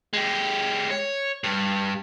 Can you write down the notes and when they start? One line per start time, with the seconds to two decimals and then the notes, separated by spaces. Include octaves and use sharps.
0.13 G#3 G4
0.91 C#5
1.44 G2